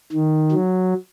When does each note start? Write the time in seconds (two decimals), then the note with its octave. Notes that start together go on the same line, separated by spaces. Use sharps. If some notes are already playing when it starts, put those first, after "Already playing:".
0.12 D#3
0.52 F#3